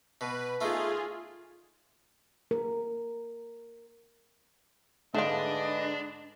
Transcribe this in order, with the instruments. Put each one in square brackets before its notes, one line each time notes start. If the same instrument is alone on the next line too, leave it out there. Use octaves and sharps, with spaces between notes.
[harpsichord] B2 [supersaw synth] B4
[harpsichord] A3 D#4 [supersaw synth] F4 G#4
[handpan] A#4
[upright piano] G#2 D3 [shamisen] A3 F4 [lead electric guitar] D4 [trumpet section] G#4 B4 D#5